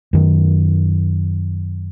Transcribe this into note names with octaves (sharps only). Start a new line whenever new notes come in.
F#2 D#3